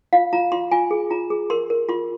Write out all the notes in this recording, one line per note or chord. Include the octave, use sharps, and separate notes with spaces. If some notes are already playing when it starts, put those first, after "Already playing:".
F4 F5
F4 A#5
F4 C6
F4 G#5
G#4
F4 A#5
G#4
A#4 C6
A#4
F4 C6